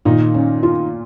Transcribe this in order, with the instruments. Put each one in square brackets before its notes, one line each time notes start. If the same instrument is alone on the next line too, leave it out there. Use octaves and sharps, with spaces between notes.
[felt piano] A#2 [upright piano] D#3 D#4
[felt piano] C#4
F4